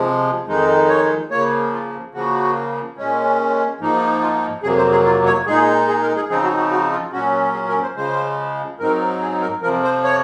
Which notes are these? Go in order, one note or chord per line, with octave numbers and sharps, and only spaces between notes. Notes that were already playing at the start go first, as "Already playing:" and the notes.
Already playing: C3 F3 G#3
F2 D#3 G#3 D#4
C#5
C#3 F3 A#3 C#5
F4
C#3 F3 A#3 F#4
A#2 G#3 C#4
G#2 F3 A#3 D#4
F4
F2 C3 F#3 A#3 G#4
C5
G#4
F4
C#5
A#2 G#3 D#4 G#4
G#4
A#4
G#4
C#3 F3 C4 D#4 G#4
F#4
F#4
F#4
F4
A#2 F#3 C#4 F#4
G#4
A#4
C5
C#3 F3 G#3 C5
G#2 F#3 C4 D#4 A#4
G#4
A#4
F2 C3 F3 A#4
C5
C#5